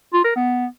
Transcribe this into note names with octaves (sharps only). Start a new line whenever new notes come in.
F4
A#4
B3